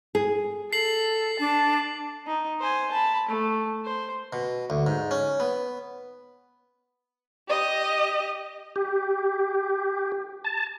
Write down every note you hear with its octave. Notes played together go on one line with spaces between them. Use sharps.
G#4
A4 C7 F#7
D4 A5
D#4
C5 G#5
A5 B5
A3
C5
B2
D2
G#2
C#4
B3
G4 D#5
G4
A5